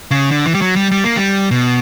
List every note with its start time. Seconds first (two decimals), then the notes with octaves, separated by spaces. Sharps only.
0.11 C#3
0.31 D3
0.46 E3
0.55 G3
0.61 F#3
0.76 G3
0.92 G3
1.04 A#3
1.17 G3
1.51 B2